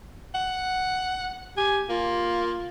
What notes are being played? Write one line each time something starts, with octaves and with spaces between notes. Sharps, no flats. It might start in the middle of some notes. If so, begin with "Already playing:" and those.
F#5
G4 G#5
A#3 F4